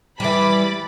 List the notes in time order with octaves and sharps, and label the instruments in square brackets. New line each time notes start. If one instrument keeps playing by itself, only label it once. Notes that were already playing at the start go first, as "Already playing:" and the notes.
[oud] E3 G3 [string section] B5 D6 A6